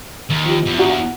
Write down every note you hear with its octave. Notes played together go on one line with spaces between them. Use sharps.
D#2
F3 G4
E2
D4 F#4 A#5
F#5